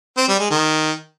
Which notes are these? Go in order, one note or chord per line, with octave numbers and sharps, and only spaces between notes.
C4
G3
G#3
D#3